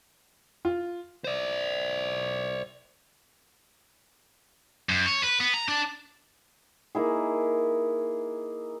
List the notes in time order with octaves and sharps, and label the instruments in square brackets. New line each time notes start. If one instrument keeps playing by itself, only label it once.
[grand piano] F4
[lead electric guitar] C5 D5
[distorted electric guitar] F#2
C#5
B4
B3
A#5
D4
[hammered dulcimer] A#3 D#4 E4 G#4